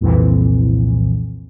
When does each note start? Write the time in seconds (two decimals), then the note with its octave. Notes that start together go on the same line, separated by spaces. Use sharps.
0.01 C2 F2 A#2 E3